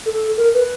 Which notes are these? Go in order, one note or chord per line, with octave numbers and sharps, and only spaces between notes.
A4
A#4
B4